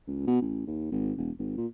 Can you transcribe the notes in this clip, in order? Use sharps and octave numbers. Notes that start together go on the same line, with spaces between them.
C#2
B2
A1
D#2
G#1
E1
G#1
A#2